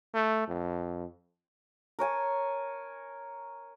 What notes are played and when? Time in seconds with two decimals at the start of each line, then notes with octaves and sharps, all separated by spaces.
0.15 A3
0.48 F2
1.99 A#4 C#5 G#5 A5